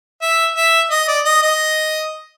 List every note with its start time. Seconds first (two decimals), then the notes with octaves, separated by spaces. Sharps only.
0.22 E5
0.56 E5
0.91 D#5
1.08 D5
1.25 D#5
1.42 D#5